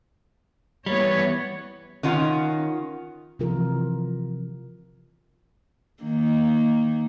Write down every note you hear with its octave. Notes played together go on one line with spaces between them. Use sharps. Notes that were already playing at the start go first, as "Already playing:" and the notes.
E3 G3 B3 C#5
D#3 C#4 F4 F#5
C3 E3 F3 F4 A#4
D#3 A#3